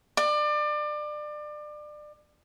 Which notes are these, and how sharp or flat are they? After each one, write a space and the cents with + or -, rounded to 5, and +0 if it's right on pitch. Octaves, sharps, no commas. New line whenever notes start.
D5 +30